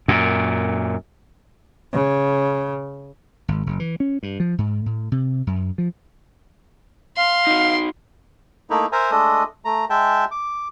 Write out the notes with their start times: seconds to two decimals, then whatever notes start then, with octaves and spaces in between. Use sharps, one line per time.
0.08 F#2 A#2
1.93 C#3
3.48 G#1
3.67 F#1
3.80 E3
4.00 C#4
4.23 G2
4.40 F3
4.58 G#2
4.86 A2
5.12 C3
5.47 F#2
5.78 F3
7.17 F5 C6
7.47 D#4 F#4
8.70 A3 A#3 D#4 E4
8.92 A#4 C5 E5 G#5 A#5
9.11 G#3 A3 D4 A4 D#5 D#6
9.65 A3 A#5
9.90 G#3 E5 G5 A5
10.31 D6